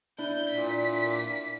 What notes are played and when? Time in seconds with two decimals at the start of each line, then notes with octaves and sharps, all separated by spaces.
0.18 D4 E4 G6
0.49 A#2 B6